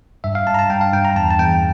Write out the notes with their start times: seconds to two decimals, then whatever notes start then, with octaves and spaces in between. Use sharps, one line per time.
0.24 G2 E5
0.35 F5
0.46 G2 A5
0.54 A#5
0.59 A5
0.70 G2 G5
0.81 F5
0.93 G2 G5
1.05 A#5
1.16 E2 A5
1.31 A5
1.39 E2 G5